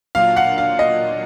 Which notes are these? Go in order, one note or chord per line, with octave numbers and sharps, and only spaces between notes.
A#2 F#3 A#3 D4 F4 F5
F#5
F5
D#5